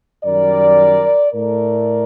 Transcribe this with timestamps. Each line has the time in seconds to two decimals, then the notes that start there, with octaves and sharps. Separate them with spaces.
0.24 F#2 D#3 G3 A#4 D5
1.32 A2 A3 A#4 D5